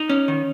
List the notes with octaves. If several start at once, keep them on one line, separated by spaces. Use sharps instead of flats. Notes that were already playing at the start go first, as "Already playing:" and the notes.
Already playing: D#4
C#4
D#3